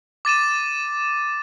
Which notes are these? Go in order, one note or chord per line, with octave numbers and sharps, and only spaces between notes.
D6 A6 D#7 E7